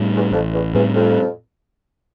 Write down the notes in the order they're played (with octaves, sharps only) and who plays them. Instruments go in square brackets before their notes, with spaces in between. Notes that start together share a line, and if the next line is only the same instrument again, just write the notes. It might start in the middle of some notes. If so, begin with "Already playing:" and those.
Already playing: [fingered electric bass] A2 G3 C4
[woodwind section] E2
[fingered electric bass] A1 [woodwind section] F2
[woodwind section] E2
[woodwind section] E2 [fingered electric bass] A2 G3 C4
[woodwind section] F2